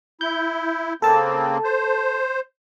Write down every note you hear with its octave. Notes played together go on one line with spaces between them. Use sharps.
E4 G6
C#3 A#3 C4 A4 A5
C5